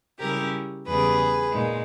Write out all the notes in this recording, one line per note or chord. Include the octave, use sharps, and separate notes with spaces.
C#3 G3 C#4 E4 G4 A#4
E2 C#3 G3 G#4 B4
A#2 G#3 D#4